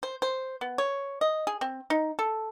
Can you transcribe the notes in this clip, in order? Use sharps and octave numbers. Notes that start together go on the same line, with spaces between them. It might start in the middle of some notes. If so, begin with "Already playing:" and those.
C5
C5
B3
C#5
D#5
G#4
C4
D#4
A4